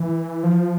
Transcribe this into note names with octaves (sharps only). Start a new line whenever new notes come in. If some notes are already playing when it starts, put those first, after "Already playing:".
Already playing: E3
F3